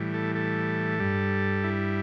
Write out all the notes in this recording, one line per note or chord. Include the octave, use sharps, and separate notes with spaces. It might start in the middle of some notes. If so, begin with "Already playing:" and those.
Already playing: A2 E3 G3
A4
A4
G2 G3
E4